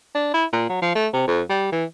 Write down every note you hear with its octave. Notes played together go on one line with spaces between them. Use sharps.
D4
E4
A#2
F#3
F3
A3
C3
F2
G3
E3